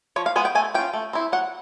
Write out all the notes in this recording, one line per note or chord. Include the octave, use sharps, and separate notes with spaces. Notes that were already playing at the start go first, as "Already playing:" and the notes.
F3 C#5
F5
G#3 B3 G#5
G5
A3 G#5
C#4 F4 G5
A3
C4 E4
F#3 F#5